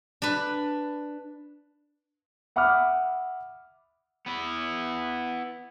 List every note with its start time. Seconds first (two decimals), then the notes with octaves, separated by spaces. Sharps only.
0.22 D4 B4
2.56 E5 F#5 B5 D6 D#6 F6
4.27 B3 E4